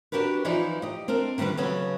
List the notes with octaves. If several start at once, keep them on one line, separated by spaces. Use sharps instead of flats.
D4 F#4 G4 A#4 B4
E3 F3 D#4 F4 D5
G4 D#5
C4 D4 A4 A#4
D3 D#3 G3 C4 B4
C#3 F#3 B3 A4